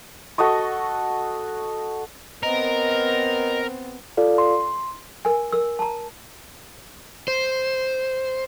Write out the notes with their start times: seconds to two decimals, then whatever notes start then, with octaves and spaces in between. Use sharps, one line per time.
0.38 F#4 A4 D#5 C#6
2.43 B3 C4 A#4 D#5
4.17 F4 A4 D5 F5
4.38 C6
5.25 A#4 G#5
5.52 A#4 E6
5.79 A5 A#5
7.28 C5